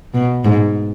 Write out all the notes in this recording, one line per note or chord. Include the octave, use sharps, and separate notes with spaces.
B2
G#2